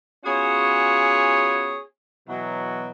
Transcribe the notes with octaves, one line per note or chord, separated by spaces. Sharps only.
B3 C#4 F4 F#4 G#4 C#5
B2 E3 F#3